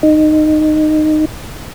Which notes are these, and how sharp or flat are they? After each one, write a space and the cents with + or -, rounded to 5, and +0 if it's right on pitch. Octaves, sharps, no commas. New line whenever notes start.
D#4 -15